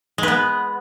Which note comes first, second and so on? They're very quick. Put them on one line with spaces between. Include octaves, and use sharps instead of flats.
G#3 B4 B3